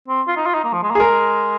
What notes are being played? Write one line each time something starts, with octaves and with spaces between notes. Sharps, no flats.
C4
F4
D#4
F4
D#4
A#3
F3
G#3
A#3
G#4
G#3 A#4